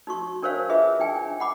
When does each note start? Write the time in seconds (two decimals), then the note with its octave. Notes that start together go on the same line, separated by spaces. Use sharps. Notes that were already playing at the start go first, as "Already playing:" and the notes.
0.07 D#4 F#4 C#6
0.42 D4 A#4 C5 C#5 F5
0.69 F4 G#4 B4 E5
0.99 D4 D#4 G5 G#5
1.40 F#5 B5 D6